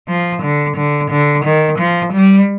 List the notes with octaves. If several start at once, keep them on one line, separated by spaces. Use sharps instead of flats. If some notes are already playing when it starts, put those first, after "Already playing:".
F3
D3
D3
D3
D#3
F3
G3